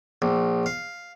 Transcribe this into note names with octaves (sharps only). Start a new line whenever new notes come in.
A#1
F5